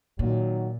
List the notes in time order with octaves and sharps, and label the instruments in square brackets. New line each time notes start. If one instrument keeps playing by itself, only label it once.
[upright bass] A#2 [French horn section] D#3 F#3